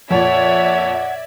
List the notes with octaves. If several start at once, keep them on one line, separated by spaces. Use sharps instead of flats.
F2 A#2 C#5 D5 E5 F#5 G#6